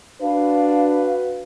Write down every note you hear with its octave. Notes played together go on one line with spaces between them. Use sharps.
D4 F#4 B4 F5